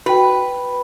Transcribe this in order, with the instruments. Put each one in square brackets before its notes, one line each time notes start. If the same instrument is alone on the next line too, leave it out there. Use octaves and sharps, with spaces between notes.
[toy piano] F#4 G5 [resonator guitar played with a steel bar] B4